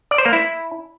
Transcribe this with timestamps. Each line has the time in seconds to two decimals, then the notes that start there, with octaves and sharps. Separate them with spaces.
0.11 D5
0.18 C5
0.26 A#3
0.33 E4